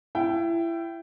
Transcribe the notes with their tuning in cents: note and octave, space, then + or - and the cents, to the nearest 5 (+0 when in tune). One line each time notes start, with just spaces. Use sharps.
E4 +25 G5 -15